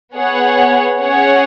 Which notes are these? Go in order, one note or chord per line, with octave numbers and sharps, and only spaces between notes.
B3 G#4 C#5 F#5
C#4 G#4 C#5 F#5